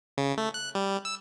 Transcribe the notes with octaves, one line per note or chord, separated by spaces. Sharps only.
C#3
A3
F#6
G3
E6